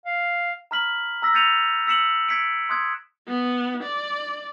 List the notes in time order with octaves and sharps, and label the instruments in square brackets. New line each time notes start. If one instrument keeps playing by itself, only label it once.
[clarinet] F5
[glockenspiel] A#5 B5 F6 B6 F#7
A#5 E6 A#6 B6
G6 A6 A#6 C#7 D#7 F7
E6 B6 C#7 E7 F#7
G#6 B6 C#7 D7
C6 D#6 F#6 G#6
[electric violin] B3
D5